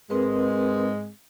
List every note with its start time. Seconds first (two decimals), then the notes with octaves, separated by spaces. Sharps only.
0.10 G#2 G#3 C4 A#4 B4